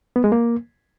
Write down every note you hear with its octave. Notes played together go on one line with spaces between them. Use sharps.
B3
G#3
A#3